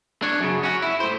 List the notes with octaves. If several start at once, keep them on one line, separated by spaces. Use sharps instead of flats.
D4 C#5
F#2 C#3
C#4 F#4
E4
A2 C5